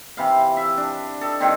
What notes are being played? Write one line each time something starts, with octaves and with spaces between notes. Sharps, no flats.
C3 E3 F5
E5
D4
A4 D#5
G2 D#3 C4